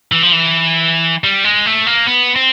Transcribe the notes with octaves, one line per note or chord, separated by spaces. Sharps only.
E3
F3
E3
G3
G#3
A3
A#3
B3
C4